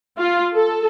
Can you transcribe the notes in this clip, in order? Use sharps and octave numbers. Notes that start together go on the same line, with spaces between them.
F4
A4